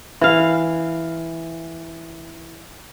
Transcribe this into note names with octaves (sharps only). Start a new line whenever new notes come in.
E3 F5